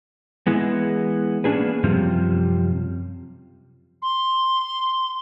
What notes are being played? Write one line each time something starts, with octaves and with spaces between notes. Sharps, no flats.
E3 G#3 B3
A#3 B3 C#4 D4 G#4 B4
F#2 C3 F3 G3
C6